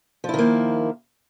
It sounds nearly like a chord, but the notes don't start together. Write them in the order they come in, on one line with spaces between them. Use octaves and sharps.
F3 E4 D#3 A#3